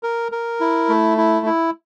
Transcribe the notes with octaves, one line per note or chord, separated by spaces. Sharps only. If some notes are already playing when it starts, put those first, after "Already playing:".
A#4
A#4
E4
A3
E4
E4